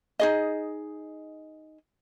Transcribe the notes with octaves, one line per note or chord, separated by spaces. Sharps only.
D#4 G#4 D#5